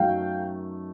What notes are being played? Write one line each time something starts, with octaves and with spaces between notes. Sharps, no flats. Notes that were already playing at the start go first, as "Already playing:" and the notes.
Already playing: F#2 D#3 F#3 A3 F5 G5